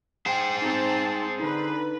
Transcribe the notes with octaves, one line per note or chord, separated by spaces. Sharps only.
G#4 C5 F#5 G5
C4 D#4 A5
D3 D#4 B4